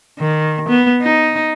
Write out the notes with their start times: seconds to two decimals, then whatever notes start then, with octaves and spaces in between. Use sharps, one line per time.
0.19 D#3
0.69 B3
1.02 D#4